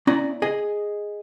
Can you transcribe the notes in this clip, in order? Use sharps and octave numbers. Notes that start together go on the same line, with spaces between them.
B3 C#4 E4 D5 A#5
G#4 D#5 G#5